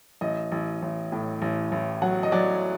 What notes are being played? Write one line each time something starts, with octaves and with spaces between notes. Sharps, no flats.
A1 D#5
A1
A1
A2
A1
A1
F#3 F#5
D#5
F#3 D5